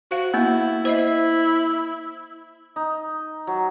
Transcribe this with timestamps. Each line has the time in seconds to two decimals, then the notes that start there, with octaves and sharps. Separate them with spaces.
0.11 F#4 C5 F5
0.34 A#3 B3 E4
0.85 E4 C5 D#5 E5
2.76 D#4
3.47 F#3